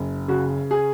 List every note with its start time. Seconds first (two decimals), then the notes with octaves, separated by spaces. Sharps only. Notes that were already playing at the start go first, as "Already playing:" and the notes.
Already playing: F#1
0.28 C#3 F#4
0.71 G#4